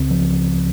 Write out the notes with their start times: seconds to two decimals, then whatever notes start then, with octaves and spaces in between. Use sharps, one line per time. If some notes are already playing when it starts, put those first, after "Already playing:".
Already playing: C#2 C#3 C4
0.11 F3